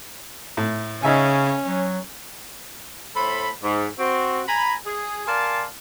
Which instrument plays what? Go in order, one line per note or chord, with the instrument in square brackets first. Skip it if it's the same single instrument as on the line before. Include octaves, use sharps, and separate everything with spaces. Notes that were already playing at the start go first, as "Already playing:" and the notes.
[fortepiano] A2
[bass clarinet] C#3 [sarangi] C#4 [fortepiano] D#4 E5 G#5
[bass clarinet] F#3
[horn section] A2 A4 C5 B5
G#2
C4 F#4
G#5 A#5 B5
G#4
A#4 D5 F5 G#5 A5 C6